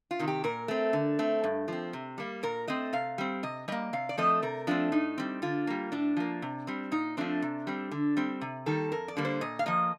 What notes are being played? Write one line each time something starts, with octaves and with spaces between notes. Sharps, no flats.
F4
C3 D#3
G4
A#2 A#4
A3 C4
D3
A3 C4
G2
F3 C4
C3
G3 A#3
A#2 A#4
A3 C4 D#5
C3 F5
G3 C4
C3 D#5
G3 A#3 D#5
C3 F5
D5
F3 A3 C4 D#5
C3 A#4
F3 A3 C4 D4
A2 D#4
G3 C4
D3 F4
G3 A#3
A2 D4
F3 A#3
C3
G3 C4
A#2 D#4
F3 A3 C4 D4
C3
G3 C4
D3
G3 C4
C3
D#3 G3 A#3 A4
F2 A#4
D5
D3 G3 A#3
C5
A#2 D#5
F5
F3 A#3 D#5